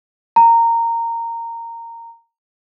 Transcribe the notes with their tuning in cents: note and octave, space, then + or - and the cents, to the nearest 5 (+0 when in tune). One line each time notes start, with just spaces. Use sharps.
A#5 -15